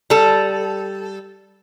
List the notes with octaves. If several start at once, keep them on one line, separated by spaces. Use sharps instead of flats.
G3 A4